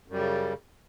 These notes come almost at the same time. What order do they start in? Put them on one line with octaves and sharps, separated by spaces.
F#2 G3 C#3